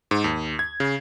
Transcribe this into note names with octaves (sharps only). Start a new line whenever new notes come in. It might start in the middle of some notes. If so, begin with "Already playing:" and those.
G#2
D#2
G#6
C#3